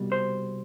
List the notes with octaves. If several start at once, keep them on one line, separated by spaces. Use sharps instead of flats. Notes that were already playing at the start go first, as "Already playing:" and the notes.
Already playing: C2 B2 G3
C5